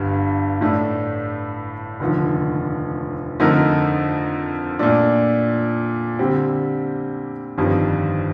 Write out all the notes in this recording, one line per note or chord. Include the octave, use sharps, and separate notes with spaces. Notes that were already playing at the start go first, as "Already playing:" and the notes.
Already playing: G1 G2 D3 G3
A2 A3 D4
F1 D#2 D3 F3
F2 D3 A3 D#4 A#4
A#2 A3 D4
D3 G3 C4 G4
G1 F2 D#3 G3